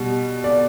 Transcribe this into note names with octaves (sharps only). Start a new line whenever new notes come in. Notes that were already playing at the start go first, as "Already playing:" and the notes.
Already playing: B2 G3
D5